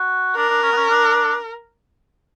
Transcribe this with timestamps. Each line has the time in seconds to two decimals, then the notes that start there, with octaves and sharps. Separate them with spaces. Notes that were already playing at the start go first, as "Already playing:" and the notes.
Already playing: F#4
0.36 D4 A#4
0.49 D4
0.62 C#4
0.72 B3
0.77 C#4
0.90 D4